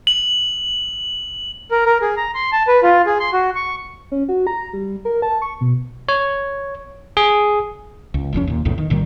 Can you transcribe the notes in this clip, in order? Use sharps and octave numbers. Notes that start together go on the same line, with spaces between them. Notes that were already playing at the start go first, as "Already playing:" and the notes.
F#7
A#4
A#4
G#4
A#5
C6
A5
B4
F4
G#4
C6
F#4
C#6
C#4
F#4
A#5
G3
A#4
A5
C#6
B2
C#5
G#4
C#2
F1 F2 B2 C#4
D#2 A#2
B1 E2 A2 C#3
D#3
A1 A#2 D#3 G3